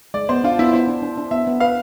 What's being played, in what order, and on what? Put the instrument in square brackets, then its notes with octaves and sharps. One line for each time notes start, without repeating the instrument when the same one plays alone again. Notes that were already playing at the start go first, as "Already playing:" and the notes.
[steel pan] G#3 [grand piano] D5
[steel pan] B3 [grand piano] C5
[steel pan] D4 [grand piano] F4
[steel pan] B3 [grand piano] E4
[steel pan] B3 [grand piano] C5
[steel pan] D4
D4
D4
[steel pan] B3 [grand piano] E5
[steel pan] B3
[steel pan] B4 [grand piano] F5